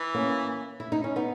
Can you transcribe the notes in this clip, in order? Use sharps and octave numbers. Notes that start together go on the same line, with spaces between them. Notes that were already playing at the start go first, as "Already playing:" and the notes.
Already playing: E3
A#3 C#4
E4
D#4
C#4
B3 D#4